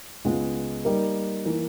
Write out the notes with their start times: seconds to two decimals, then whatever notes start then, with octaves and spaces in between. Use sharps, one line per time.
0.25 C#2 C#3 G#3 B3
0.85 G3 A#3 D#4 A#4
1.45 E3 A#3